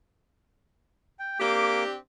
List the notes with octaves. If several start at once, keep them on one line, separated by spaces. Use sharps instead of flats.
G5
A#3 C4 D4 G4 D6